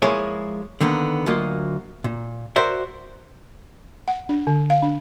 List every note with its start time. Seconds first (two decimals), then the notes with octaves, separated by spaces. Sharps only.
0.02 F3 G#3 A#3 E4 G#4 C#5
0.81 D3 D#3 A#3 B3
1.26 D2 F#3 A#3 F4 D#5
2.04 A#2
2.56 F#4 A#4 C5 D5 E5
4.08 F#5
4.29 D4
4.47 D3
4.70 F5
4.82 D4